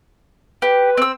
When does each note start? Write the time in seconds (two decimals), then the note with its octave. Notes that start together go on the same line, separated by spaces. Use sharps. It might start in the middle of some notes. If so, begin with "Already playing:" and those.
0.62 G4 B4
0.97 C4 E6